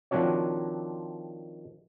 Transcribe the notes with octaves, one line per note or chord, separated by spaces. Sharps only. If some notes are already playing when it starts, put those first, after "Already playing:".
D#3 F3 C4 D4 F#4 C#5